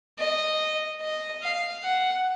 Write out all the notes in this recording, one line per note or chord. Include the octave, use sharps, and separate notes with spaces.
D#5
D#5
F5
F#5